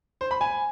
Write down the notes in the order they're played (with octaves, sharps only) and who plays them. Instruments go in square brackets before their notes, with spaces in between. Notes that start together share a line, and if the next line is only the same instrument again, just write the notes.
[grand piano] C5
B5
G#5